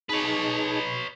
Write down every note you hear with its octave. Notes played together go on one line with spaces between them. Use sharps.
D#4 G#4 B4 C#5 A5